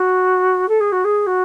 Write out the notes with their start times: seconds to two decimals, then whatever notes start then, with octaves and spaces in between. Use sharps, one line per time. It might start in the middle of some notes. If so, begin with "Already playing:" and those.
Already playing: F#4
0.68 A4
0.80 G#4
0.92 F#4
1.04 G#4
1.26 F#4